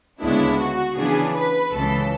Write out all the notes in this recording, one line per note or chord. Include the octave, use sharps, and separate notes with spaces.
D2 C#3 G#3 B3 D4 E4
F#4
C#3 E3 B3 D4 G#4
B4
C#2 C#3 E3 A4